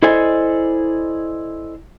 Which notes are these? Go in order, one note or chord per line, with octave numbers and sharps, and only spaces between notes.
E4 A4 C5 D5 D#5 G#5